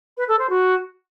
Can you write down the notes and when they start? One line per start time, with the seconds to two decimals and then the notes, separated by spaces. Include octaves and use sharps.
0.17 B4
0.28 A4
0.39 C5
0.49 F#4